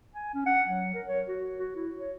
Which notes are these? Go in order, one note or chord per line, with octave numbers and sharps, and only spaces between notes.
G#5
C#4
F#5
F#3
A#4
C#5
F#4
F#4
E4
C#5